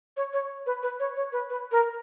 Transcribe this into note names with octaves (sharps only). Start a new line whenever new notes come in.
C#5
C#5
B4
B4
C#5
C#5
B4
B4
A#4